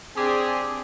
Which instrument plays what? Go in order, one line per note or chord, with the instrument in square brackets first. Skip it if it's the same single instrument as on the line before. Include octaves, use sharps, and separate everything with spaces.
[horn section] C4 D4 G4 G#4